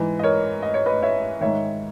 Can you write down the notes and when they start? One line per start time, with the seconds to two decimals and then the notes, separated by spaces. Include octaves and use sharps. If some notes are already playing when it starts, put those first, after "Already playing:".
Already playing: G#2 E3
0.19 D#5
0.24 A#4 C#5
0.62 D#5
0.74 C#5
0.86 B4 D#5
1.02 C#5 E5
1.41 G#2 D#3 C#5 E5